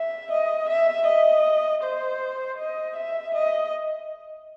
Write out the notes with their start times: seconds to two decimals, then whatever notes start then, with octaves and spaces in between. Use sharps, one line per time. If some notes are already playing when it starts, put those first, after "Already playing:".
Already playing: E5
0.32 D#5
0.69 E5
1.07 D#5
1.83 C5
2.58 D#5
2.97 E5
3.35 D#5